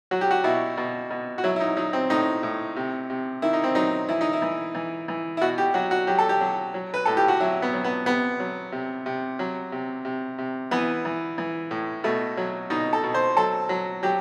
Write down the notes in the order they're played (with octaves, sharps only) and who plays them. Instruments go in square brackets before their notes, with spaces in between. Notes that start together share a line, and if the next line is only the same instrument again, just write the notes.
[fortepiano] F#3 F#4
G4
F#4
B2 E4
B2
B2
F#4
F#3 E4
E4
D#4
F#3 D#4
C4
A2 D#4
A2
C3
C3
D#3 E4
D#4
C4
F#3 D#4
E3 E4
D#4
E4
E3
E3
E3
E4
B2 F#4
G4
F#3 F#4
F#4
F#3 G4
A4
G4
F#3
F#3
B4
A2 A4
G4
F#4
F#3 E4
B3
F#3
B3
C3 B3
F#3
C3
C3
F#3
C3
C3
C3
E3 B3
E3
E3
A2
B2 A3
F#3
B2 D#4
A4
B2
C5
F#3 A4
F#3
F#3 G4